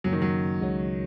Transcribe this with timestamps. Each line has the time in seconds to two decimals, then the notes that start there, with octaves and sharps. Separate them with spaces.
0.04 F#2 C#3 F#3 A#3 C#4
0.13 D#3
0.22 F#3
0.60 C#2 C#3 G#3 F#4 C#5